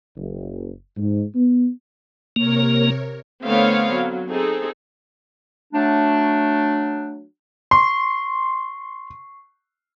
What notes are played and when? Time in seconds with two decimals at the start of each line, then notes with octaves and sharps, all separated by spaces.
0.16 F#1
0.97 G#2
1.36 B3
2.36 C3 A#3 A#4 C#5
3.45 D3 A3 B3 C4 C#5 F5
3.94 F#3
4.30 C4 D#4 G#4 A4
5.73 F#3 A3 D4
7.71 C6 C#6 C7